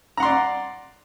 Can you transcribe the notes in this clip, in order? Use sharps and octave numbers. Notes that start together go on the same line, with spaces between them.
D5 F#5 A#5 C6